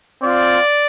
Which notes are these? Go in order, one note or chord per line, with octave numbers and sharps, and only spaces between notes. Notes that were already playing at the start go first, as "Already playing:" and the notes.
C4 F4 D5